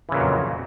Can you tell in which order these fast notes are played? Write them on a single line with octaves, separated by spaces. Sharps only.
E3 C#3 A#2 F#3 F2